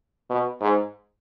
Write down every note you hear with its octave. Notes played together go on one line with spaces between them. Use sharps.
B2
G#2